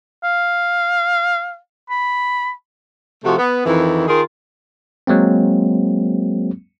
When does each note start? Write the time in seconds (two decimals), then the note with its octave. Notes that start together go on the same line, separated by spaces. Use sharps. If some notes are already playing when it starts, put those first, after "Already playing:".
0.23 F5
1.90 B5
3.24 C3 F3 A3 F#4
3.38 B3
3.66 F2 D#3 E3
4.07 D#3 F4 G#4 A#4
5.07 F#3 G#3 A#3 C4